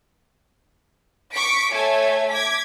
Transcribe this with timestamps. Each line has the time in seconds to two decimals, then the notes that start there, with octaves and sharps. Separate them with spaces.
1.34 C#6 D6 B6 D7
1.71 A3 A4 C#5 E5 G#5
2.30 D6 G#6 B6